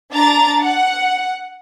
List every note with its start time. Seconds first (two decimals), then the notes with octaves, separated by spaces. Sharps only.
0.12 D4 A#5 A6
0.60 F#5